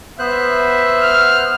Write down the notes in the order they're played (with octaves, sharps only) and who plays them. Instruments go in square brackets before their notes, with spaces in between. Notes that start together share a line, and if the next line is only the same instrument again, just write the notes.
[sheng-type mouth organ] B3 C5 F#6 [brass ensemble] E5
[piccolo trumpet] F6